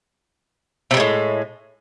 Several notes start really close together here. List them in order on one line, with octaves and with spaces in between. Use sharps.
C3 G3 G#3 A2